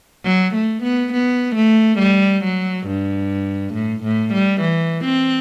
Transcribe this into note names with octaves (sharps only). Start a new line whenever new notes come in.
F#3
A3
B3
B3
A3
G3
F#3
G2
A2
A2
G3
E3
C4